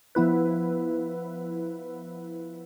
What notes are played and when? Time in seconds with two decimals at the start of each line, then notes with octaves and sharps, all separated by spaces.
0.15 F3 B3 E4 B4